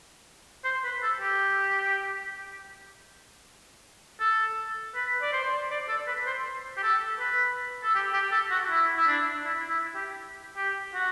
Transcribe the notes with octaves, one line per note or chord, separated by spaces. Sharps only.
C5
B4
A4
G4
A4
B4
D5
C5
D5
A4
B4
C5
G4
A4
B4
A4
G4
G4
A4
F#4
E4
E4
D4
E4
E4
G4
G4
F#4